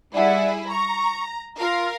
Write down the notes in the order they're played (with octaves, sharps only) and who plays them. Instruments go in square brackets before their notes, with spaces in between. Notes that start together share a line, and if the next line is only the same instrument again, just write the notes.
[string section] G3 E4 G#4 [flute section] D5 E5 F#5
[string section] A#5 [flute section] C#6
[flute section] F4 [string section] A#4 F5